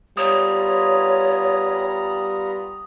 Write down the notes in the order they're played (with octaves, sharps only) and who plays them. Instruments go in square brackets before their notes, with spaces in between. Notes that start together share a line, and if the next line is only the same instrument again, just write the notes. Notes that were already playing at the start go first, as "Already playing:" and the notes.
[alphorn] G3 [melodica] B3 F4 A#5 [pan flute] C#5 [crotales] D#6